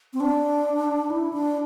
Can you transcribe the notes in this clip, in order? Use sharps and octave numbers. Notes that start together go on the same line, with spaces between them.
C4
D4
E4
D4